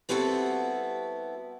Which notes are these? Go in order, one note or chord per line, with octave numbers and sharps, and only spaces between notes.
G3 B3 C4 E4 F#4 A4